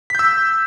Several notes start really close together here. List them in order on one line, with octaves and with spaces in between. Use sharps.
B6 G6 E6